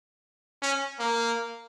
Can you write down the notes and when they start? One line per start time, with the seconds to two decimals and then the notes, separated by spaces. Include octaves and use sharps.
0.62 C#4
0.99 A#3